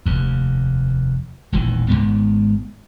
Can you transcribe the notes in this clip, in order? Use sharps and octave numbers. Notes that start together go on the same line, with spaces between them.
F1 D#2
E1 A#1 D#3 E3
G#1 F2 G#2 B3